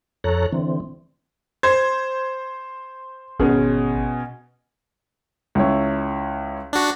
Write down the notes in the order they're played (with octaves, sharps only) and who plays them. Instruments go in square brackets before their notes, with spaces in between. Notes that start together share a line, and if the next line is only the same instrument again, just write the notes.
[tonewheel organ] F2 A4 C#5 A#5 F#6
D3 E3 C4
[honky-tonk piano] C5 [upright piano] G#6
[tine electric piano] G#1 [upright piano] B2 C#4 G#4
[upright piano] C#2 E4 C#5
[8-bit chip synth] D4 F#4